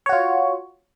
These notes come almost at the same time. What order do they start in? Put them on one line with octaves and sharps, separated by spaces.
C#5 F#4 F4